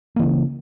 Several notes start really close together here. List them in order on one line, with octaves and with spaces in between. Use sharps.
A#3 E3 C#3